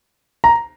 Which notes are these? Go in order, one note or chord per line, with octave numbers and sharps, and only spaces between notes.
A#5